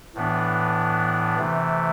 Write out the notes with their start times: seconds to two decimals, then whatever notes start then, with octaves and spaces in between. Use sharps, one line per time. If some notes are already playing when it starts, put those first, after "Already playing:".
0.15 A2 E3 B3 D4
1.39 C3 E3 A3